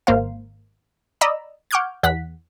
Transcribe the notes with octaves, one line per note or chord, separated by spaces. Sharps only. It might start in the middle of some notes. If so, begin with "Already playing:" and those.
G#1 A#3 C5 F5
D5 D#5 A#5 B5 E6
F#5 C#6 D6 F6 G6 G#6
E2 F#5 F#6 B6